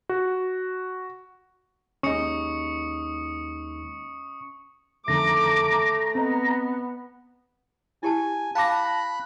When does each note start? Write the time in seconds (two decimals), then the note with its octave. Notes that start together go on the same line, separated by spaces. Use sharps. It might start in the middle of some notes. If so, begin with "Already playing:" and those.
0.09 F#4
2.03 D#2 G#3 C#4 D#4 D#5 C#6 D#6 C#7
5.08 F2 D3 D#3 A3 A#5 D6
6.15 B3 C4 D#5
8.03 E4 G4 G#5 A5
8.55 F5 G5 A5 B5 D6 F#6 A#6